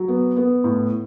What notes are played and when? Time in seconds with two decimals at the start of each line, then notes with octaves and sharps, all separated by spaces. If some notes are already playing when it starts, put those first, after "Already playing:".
Already playing: F#3
0.08 B3
0.36 B3
0.64 A2